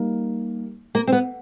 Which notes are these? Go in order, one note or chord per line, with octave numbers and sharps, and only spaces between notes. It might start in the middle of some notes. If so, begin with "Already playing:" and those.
Already playing: G3 A#3 D#4
A#3
C4
B3